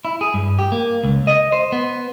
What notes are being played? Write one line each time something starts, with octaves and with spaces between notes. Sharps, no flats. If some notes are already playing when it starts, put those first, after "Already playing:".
E4
G#4
G2
G4
A#3
C#2
D#5
C5
B3